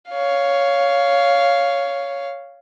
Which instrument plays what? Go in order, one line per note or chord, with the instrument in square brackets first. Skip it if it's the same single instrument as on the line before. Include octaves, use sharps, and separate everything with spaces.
[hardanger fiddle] C#5 F5